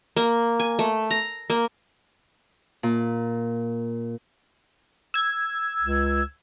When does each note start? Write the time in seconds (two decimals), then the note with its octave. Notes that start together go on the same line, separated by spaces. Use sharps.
0.16 A#3
0.60 G#5
0.79 A3
1.11 A#5
1.50 A#3
2.83 A#2
5.14 E6 G#6
5.82 C#2